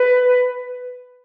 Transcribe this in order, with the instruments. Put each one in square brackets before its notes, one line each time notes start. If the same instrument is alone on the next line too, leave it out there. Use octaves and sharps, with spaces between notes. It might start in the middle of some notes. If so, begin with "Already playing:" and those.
Already playing: [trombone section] B4